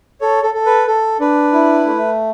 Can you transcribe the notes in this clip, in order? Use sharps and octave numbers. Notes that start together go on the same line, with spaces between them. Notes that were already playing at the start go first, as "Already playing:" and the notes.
A4 C#5
A4
A4
B4
A4
D4 B4
E4
A3